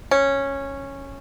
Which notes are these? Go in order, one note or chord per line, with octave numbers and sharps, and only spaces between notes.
C#4